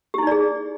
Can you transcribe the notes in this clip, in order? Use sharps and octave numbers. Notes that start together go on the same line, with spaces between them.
D#4 E4 G4 G#4 D5